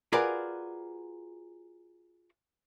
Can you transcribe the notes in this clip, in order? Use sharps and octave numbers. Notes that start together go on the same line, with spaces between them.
F4 F#4 G#4 A#4 B4 D5